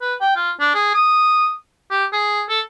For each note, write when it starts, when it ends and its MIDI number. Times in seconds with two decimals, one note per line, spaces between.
0.02 0.14 71
0.21 0.32 79
0.36 0.51 65
0.60 0.70 62
0.75 0.94 68
0.95 1.53 87
1.91 2.05 67
2.13 2.43 68
2.49 2.60 69